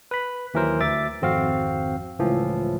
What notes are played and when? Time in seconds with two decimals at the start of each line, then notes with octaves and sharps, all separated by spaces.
0.11 B4 B5
0.54 D#2 E3 F#3 A#4 C5
0.81 D2 E5 D6 A6
1.21 G#1 F2 C4 F#4 F5
2.19 C#2 A2 E3 F3